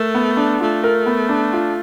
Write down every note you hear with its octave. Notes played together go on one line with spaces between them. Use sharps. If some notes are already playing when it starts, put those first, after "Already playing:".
Already playing: A3 A#4
B3
D4
A3 F4
A#4
B3
D4
F4